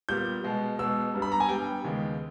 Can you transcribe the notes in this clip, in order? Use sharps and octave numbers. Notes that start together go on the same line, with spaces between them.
A#2 G3 B3 G6
B2 G#3 B3
B2 G#3 B3 E6
G2 G3 B3
B5
A#5
G#5
G2 G3 B3 G5
D#2 C#3 G#3 B3